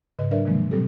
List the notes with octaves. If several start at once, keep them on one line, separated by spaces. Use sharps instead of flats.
G#2 C#3 B4 D#5
F#3 D4 A#4 B4 D5 E5
C3 D#3 F3 F#3 G#3 A#3
B2 F#3 G3 C4 G4 A4